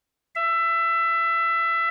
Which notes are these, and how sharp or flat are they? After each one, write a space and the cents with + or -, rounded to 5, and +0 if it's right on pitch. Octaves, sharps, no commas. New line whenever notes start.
E5 +20